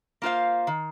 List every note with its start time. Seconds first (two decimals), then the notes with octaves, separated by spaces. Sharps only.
0.22 A#3 F4 C5 F5
0.67 D#3